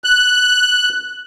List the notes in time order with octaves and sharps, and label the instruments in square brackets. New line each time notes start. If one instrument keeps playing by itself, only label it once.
[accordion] F#6